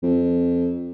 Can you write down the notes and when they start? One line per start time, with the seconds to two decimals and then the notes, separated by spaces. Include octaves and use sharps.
0.03 F2